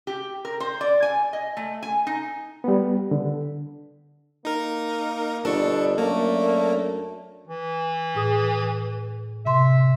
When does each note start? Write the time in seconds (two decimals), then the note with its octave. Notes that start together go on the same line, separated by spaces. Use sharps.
0.07 G4
0.45 A#4
0.60 C5
0.81 D5
1.02 G#5
1.33 D#5
1.57 A3
1.83 G#5
2.07 D#4
2.64 G3 B3
3.11 D3
4.45 A#3 D#4 A#4
5.45 G1 B2 D4 A4 C#6
5.98 F#2 A3 A#3
7.47 E3
8.15 A2 G#4 D#6
9.45 C3 E5 C6